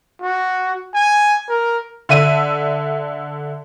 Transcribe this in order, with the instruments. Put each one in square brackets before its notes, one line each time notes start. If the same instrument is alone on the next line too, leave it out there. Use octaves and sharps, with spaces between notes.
[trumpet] F#4
G#5
A#4
[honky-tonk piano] D3 E5 D#7